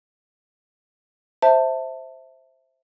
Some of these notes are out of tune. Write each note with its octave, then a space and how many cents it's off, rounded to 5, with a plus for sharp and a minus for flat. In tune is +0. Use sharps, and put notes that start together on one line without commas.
C5 +0 E5 -5 A5 +20